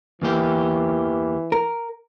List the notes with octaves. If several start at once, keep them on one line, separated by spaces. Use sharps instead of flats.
E2 E3 A#3 G4
A#4